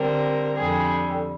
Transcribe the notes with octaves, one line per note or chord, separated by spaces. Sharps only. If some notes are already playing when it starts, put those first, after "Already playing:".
Already playing: D3 G3 C4 A#4
F2 D3 G3 G#4